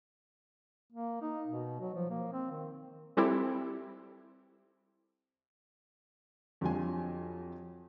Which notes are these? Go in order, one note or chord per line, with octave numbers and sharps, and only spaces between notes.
A#3
D#4
B2
F#3
F3
A#3
C4
D#3
G3 C4 E4 G4 A4
F2 F#3 G3 D4 F4 G#5